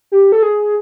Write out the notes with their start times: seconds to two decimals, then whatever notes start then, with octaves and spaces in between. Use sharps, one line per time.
0.12 G4
0.32 A4
0.43 G#4